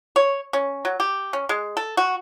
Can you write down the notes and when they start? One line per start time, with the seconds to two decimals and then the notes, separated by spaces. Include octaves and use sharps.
0.16 C#5
0.53 C#4
0.85 F#3
1.00 G4
1.33 C#4
1.49 G#3
1.77 A4
1.97 F#4